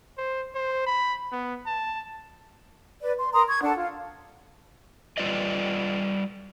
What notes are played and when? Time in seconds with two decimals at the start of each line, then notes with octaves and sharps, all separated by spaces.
0.17 C5
0.55 C5
0.86 B5
1.32 B3
1.66 A5
3.02 B4 D5
3.18 C6
3.33 A#4 A#5 C6 D#6
3.48 C#6 G#6
3.62 D4 A4 F#5 A5
3.76 F4
5.18 G3 A3 F4 B4 D5 D#5